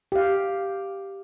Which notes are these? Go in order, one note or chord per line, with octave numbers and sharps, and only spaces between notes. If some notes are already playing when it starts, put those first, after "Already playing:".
G4 F5